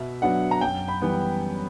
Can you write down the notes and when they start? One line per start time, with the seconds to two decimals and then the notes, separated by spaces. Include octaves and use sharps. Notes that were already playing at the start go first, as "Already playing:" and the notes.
Already playing: B2 E5
0.22 F#3 B3 D4 F#5
0.51 A#5
0.61 F#2 G5
0.88 B5
1.02 E3 G3 B3